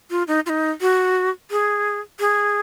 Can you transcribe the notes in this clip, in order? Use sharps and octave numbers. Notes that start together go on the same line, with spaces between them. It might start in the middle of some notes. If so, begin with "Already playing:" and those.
F4
D#4
F4
D#4
F#4
G#4
G#4